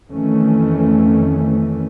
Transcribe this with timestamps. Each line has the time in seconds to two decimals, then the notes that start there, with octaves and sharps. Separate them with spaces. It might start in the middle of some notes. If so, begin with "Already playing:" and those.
0.11 F2 D#3 E3 A3 C#4